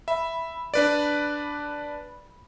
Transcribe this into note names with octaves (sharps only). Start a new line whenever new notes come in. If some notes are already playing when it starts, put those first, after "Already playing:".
E5 B5
D4 B4 D5